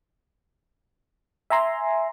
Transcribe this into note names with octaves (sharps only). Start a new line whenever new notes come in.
E5 G#5 A#5 C6